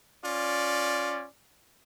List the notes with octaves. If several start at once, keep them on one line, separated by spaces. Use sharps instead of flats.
C#4 F4 D5